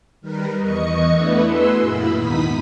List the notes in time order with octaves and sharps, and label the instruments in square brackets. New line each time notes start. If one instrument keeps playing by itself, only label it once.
[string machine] D#3 G3 A#4 B4
E2 D#5 C#6 C#7
A3 B3 D4 E4 B4
F#4 G#4 B4 C6 E6
F#2 A#2 A#3 E4 B5
D#2 G#2 B3 D#4 D#6 B6